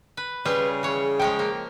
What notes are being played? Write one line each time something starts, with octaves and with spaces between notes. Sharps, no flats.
B4
C#3 G3 F4 G#4 B4
E3 G#4 C#5
F3 G#3 C#5 G5
A#3